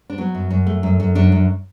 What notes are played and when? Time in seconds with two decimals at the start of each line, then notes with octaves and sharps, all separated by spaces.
0.10 D4
0.18 F#3 B3
0.35 F#2
0.50 F#2
0.67 A3
0.83 F#2
1.00 F#2
1.15 F#2 D4
1.32 F#2